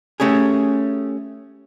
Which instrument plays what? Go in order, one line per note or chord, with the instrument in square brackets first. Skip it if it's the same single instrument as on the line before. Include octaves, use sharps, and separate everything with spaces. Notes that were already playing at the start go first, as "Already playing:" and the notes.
[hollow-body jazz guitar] A3 C#4 G4 G#4